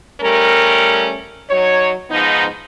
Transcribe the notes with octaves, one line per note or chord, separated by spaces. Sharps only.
G3 A3 C#4 A#4
F#3 D#4 C#5
G#2 F3 B3 D#4